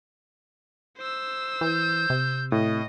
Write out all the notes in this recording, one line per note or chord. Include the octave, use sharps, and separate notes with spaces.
C5 E6
E3 G6
C3
A2 D#5